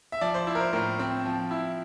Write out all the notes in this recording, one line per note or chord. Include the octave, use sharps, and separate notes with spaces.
E5
F3 D5
C5
E4
A#4
C5
A2 A#4
C4
F3
E4